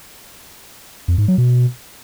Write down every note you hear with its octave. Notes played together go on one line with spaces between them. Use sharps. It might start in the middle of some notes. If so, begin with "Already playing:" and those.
F2
G#2
F#3
B2